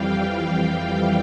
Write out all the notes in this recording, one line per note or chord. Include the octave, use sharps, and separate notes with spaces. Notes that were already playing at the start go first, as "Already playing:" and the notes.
Already playing: F2 E3 G3 F5 G5